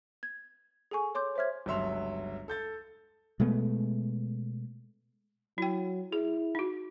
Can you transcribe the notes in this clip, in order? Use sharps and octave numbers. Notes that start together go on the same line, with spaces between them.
G#6
G#4 A4 G#5 C#6
C#5 C6 D6 G6
C5 C#5 E5 F6 G#6
G1 C#2 F#3 E5 C6 F7
A4 G6 A6
B2 G#3 A3 B3
F#3 E4 G5
E4 G#4
D#4 F#4